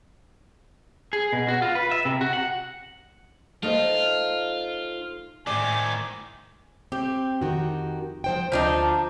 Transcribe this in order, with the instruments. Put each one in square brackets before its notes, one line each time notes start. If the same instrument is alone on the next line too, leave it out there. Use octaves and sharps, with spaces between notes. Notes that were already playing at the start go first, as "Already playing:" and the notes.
[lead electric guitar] G#4
B2
F#4
F4
B4
E5
C3
F#4
F#5
[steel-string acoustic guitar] A3 D#4 C5 [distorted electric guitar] F4
[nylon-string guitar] A2 D5 [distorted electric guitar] D#3 C4 [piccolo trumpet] G#5 [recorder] D6
[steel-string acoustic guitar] C4 [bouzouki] G4
[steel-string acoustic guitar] F2 D#3 F#4
F3 C5 G5
[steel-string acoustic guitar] D2 [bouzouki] F3 D4 D#4